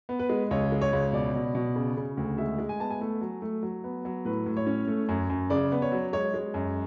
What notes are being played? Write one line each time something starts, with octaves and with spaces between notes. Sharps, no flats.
B3
B4
G#3
C#2 C#5
G#3
C#5
C#2
B2 D5
B2
B2
C#3
C#3
D2
G#3 E5
G#3
G#5
B3 A5
G#5
A3
F#3
A3
F#3
B3
F#3
A2 B4
A2
C#5
C#4
A3
F#2
F#2
C#3 D5
B3
C#5
F#3
G#3 C#5
G#3
F#2